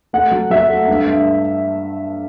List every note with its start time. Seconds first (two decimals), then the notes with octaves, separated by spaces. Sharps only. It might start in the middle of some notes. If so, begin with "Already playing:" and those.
0.13 A3 F#5
0.31 F#3
0.50 F#3 E5
0.69 A3
0.88 G2
1.07 G2